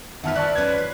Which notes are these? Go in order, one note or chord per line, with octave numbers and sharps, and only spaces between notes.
D#3 F3 B3 B4 E5 F#5 A5 F6
B4 D5 A5 C#6 F#6
F3 C#4 B4 G#6
F4